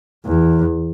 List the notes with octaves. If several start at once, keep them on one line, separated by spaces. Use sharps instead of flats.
E2